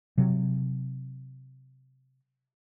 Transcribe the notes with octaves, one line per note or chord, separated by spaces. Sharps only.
C3 F#3